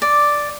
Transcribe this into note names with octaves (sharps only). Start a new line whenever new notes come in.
D5